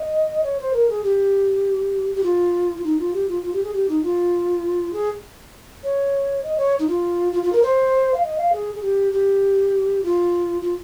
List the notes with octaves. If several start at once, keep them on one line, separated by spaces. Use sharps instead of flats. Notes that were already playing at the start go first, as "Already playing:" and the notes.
Already playing: D#5
C#5
C5
A#4
G#4
G4
G4
F4
F4
D#4
F4
G4
F4
F4
G4
G#4
G4
D#4
F4
G#4
C#5
D#5
C#5
D#4
F4
F4
F4
A#4
C5
F5
D#5
F5
G#4
G#4
G4
G4
F4
F4